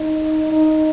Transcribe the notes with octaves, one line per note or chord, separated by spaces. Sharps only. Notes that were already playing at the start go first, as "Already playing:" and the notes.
Already playing: D#4
D#4